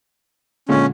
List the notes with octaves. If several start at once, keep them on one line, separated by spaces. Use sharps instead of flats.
A#2 D3 G#3 C#4